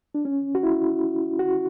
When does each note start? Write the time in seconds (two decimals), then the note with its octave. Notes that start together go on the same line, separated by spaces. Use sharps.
0.15 D4
0.25 C#4
0.55 F#4
0.63 E4
1.39 F#4